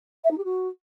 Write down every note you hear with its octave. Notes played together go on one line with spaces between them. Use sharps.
E5
D#4
G4
F#4